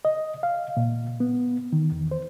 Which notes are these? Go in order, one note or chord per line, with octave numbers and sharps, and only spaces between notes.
D#5
F5
A#2
B3
D#3
E2
C5